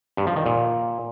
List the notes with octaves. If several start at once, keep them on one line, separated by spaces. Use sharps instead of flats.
G2
F3
D#3
A#2